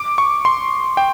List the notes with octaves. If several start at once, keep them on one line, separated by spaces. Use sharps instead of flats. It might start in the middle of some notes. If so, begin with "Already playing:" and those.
Already playing: D6
C#6
C6
G5